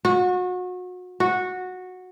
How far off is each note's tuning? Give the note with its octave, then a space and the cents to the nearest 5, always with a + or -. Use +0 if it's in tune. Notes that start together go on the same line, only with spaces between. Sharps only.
F#4 -30
F#4 -10